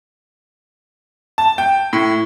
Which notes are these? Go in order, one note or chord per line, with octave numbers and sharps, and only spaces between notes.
A5
G5
A2